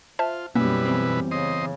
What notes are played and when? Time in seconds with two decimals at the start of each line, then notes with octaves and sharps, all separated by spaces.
0.19 F4 C5 E5 A5
0.55 F#2 B2 G3 A#3 B3 C#4 E4 B4
0.85 E2 C4
1.31 C#3 C5 D#5